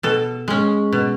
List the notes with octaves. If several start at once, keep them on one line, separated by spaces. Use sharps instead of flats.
B2 A4
G#3 C#4
B2